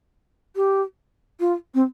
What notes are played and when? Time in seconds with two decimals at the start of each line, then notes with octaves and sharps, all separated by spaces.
0.56 G4
1.40 F4
1.74 C4